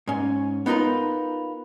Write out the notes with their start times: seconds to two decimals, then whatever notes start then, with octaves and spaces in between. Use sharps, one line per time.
0.08 G#2 C#4
0.66 B3 D#4 F4 A#4 B4